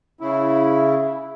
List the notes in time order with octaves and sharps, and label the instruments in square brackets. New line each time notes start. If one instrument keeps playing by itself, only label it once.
[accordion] C#3 E4